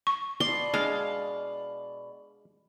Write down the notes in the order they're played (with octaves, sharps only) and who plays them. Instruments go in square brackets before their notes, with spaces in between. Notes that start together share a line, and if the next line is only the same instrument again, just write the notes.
[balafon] C#6
[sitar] B2 D5 [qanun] C6
[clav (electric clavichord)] G#3 D4 [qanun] F5